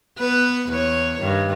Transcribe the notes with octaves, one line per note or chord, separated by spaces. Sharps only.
B3 B4
E2 B4 C#5
G2 D#3